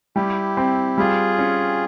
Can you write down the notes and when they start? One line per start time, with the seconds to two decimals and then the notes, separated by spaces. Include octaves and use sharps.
0.16 G3 E4 G4
0.57 C4
0.98 G3 F4 G#4
1.39 C#4